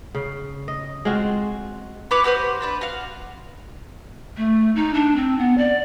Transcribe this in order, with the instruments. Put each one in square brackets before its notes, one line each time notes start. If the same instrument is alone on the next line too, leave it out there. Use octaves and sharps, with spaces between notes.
[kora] C#3
D#5
G#3 C4 F4 F#4
[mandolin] E4 B4 C#5 D6
F#4 G4 B4 C5
C4 D4 B4
F#4 F5
[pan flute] A3
D#4
D4
C4
B3
D5